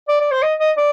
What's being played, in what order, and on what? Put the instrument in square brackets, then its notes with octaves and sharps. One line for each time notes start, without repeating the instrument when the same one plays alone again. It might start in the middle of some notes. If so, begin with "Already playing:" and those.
[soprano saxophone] D5
D5
C5
D#5
D#5
D5